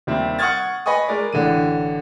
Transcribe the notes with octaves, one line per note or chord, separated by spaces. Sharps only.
D#2 G3 C4 E5
F#5 C#6 D#6 F6 G#6 A6
B4 D#5 G#5 C#6 D#6
G#3 A#4 D5
A1 D3 E3 D#7